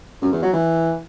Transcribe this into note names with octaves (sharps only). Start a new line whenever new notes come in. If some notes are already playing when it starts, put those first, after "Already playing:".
F#2
E2
F#3
E3